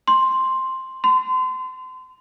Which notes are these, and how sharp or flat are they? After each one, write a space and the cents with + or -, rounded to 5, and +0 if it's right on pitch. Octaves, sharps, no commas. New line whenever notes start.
C6 +5
C6 -35